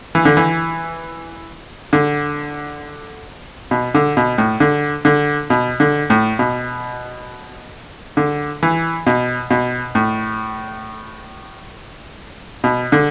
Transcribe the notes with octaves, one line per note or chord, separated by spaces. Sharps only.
E3
D3
E3
D3
B2
D3
B2
A2
D3
D3
B2
D3
A2
B2
D3
E3
B2
B2
A2
B2
D3